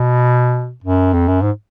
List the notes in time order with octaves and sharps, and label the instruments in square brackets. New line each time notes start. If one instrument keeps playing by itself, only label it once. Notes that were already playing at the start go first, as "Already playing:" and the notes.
Already playing: [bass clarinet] B2
F#2
F2
F#2
G#2